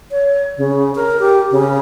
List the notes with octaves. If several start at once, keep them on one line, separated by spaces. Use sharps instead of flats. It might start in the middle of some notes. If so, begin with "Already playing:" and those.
C#5
C#3
A#4
G4
C#3